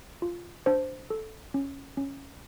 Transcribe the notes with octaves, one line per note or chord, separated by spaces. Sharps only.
F4
D4 C5
A4
C#4
C#4